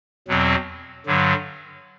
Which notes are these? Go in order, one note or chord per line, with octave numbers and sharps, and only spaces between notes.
E2 B2 F#3 C4
G2 D3 F#3